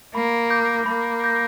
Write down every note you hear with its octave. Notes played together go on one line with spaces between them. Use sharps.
A#3 B5
D6 G6 A#6
A#3 B5
D6 G6 A#6